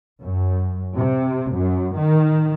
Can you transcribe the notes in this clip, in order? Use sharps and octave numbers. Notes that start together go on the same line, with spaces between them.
F#2
C3
F#2
D#3